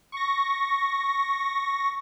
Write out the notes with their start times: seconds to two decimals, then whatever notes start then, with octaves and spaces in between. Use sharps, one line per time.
0.12 C#6 A#6